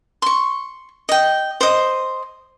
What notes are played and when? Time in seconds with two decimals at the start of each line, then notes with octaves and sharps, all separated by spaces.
0.22 C6 C#6
1.09 D#5 G5
1.61 C5 D#5